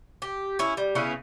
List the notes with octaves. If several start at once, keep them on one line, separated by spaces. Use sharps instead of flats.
G4
C#4 E4
G3
C#3 B3 C#4 E4